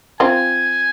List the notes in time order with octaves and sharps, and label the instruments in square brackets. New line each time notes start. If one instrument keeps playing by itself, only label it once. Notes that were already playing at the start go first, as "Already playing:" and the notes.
[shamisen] C4 F4 [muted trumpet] G#5